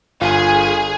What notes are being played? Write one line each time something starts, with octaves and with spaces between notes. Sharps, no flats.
G1 F4 G#4 F5